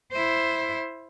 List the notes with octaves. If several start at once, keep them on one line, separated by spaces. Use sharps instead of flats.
E4 C5